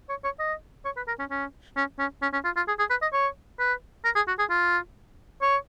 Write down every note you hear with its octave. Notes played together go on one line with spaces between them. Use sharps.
C#5
C#5
D#5
C#5
B4
A#4
C#4
C#4
C#4
C#4
C#4
C#4
F4
F4
G#4
G#4
B4
D#5
C#5
B4
A#4
G#4
F#4
G#4
F4
C#5